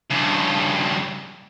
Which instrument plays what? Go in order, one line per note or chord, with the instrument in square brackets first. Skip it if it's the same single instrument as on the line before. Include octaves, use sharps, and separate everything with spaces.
[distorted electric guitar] G2 C#3